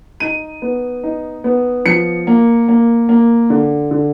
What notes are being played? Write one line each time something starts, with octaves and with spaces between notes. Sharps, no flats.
D#4 D#7
B3
D#4
B3
F3 C#7
A#3
A#3
A#3
D3
D3